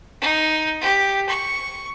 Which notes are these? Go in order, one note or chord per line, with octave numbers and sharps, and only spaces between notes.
D#4
G4
C#6